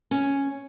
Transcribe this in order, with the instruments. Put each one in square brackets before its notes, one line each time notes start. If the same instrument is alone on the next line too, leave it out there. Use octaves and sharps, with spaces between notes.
[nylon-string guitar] C#4